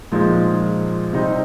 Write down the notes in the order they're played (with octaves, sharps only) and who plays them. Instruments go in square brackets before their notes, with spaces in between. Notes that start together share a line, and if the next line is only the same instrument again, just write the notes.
[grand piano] A#2 F3 G#3 D#4
C3 G3 C4 D#4